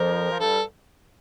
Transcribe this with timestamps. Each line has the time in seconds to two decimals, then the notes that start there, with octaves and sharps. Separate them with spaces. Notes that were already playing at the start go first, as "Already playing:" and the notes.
Already playing: F2 F3 A#4
0.31 F3
0.39 G2 G3 A4